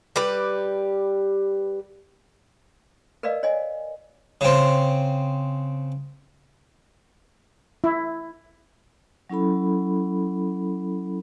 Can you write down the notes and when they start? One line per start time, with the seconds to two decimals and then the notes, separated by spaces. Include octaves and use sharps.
0.16 G3 G4 B4
3.23 A#4 B4 D5 D#5 F5
3.43 C#5 D#5 G#5
4.41 C#3 C4
7.84 E4
9.30 F#3 C#4 E4 A4 B5